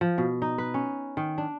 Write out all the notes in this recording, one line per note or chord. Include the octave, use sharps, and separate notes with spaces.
F3
B2
D#4
B4
C#4
D#3
D4